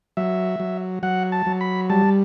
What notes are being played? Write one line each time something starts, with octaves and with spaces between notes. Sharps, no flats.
F#3 E5
F#3
F#3 F#5
A5
F#3
B5
G3 A5